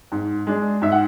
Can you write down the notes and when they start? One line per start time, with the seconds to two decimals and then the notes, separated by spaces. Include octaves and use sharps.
0.12 G#2
0.47 G#3 D4
0.82 G#2 E5
0.92 F#5